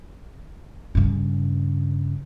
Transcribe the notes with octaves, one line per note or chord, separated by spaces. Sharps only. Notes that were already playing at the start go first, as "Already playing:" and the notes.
G2 C#3